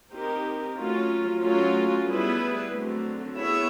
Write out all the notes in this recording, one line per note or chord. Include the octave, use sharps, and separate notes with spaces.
C4 D#4 G4 A#4
F#3 A3 C#4 F4
F#3 A3 C#4 F4
G3 B3 E4 G#4 B4
D3 F#3 A3 C4
B3 E4 G#4 C#5 E5